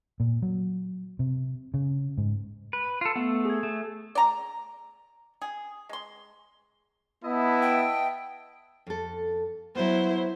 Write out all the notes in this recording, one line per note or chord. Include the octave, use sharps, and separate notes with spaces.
A#2
F#3
C3
C#3
G#2
B4
F4 A4
A3 B3
G#4 G#6
A3
D5 A#5
G#4
G#3 C6
B3 E4 D#5 E5 A5
G5
F2 A4
F#3 B3 E4 C5